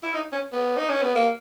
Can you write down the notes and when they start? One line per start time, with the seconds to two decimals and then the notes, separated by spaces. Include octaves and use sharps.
0.03 E4
0.14 D#4
0.32 C#4
0.52 B3
0.77 D#4
0.90 C#4
1.02 B3
1.15 A#3